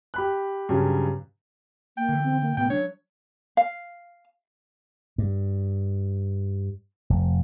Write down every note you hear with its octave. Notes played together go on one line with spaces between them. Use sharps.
G4 B5 F#6
G2 C#3 F#3
A#3 G5
D3 E3
C4
A#3
A2 C3 B3 G5
F3 F#3 D4 C#5
F5
G2
F1